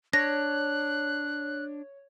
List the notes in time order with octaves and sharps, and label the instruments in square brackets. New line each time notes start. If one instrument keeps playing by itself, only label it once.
[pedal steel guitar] D4 [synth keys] C#5 [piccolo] F#6 [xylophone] A#6